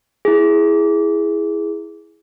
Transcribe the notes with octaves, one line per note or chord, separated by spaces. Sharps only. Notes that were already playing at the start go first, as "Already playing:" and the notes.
E4 G#4